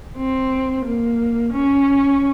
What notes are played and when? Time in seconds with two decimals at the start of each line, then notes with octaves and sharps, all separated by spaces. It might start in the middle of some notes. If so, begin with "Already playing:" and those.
0.17 C4
0.85 A#3
1.53 C#4